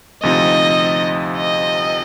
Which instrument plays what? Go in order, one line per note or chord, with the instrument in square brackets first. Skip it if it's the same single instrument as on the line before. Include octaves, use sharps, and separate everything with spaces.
[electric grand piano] D2 C3 F3 C4 D#4 [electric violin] D#5
[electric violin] D#5